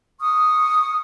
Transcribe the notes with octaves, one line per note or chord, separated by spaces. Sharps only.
C#6 D#6 F6